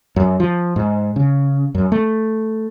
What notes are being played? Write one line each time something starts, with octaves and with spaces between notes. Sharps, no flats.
F#2
F3
G#2
C#3
F#2
A3